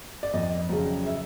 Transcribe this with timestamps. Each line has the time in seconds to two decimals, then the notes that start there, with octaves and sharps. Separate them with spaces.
0.23 D5
0.34 F2 D#5
0.69 C#3 F#3
1.07 E5